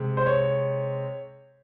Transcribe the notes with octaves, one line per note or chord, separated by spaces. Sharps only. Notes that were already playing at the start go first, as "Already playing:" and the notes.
Already playing: C3 G#3
C5
C#5